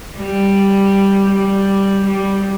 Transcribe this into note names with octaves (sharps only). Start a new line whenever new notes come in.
G3
G3
G3